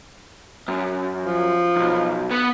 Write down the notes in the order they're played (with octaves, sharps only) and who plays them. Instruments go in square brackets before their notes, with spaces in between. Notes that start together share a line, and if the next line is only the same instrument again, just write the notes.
[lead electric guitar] F#2
[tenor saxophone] F3
[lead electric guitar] B1 E2
B3